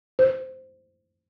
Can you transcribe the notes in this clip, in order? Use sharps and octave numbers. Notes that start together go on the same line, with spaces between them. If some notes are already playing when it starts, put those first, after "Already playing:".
C5